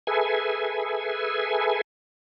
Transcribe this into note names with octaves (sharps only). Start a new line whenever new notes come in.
G#4 A4 B4 E5 G#5